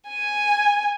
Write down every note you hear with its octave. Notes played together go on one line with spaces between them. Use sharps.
G#5